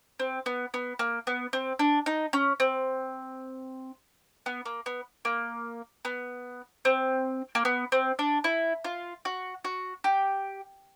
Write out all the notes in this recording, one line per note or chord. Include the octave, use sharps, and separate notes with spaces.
C4
B3
B3
A#3
B3
C4
D4
D#4
C#4
C4
B3
A#3
B3
A#3
B3
C4
A#3
B3
C4
D4
E4
F4
F#4
F#4
G4